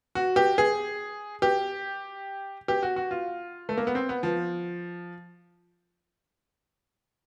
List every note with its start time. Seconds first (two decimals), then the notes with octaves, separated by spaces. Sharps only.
0.15 F#4
0.36 G4
0.58 G#4
1.42 G4
2.68 G4
2.83 F#4
2.96 F#4
3.11 F4
3.69 A3
3.77 A#3
3.87 B3
3.95 C4
4.09 B3
4.23 F3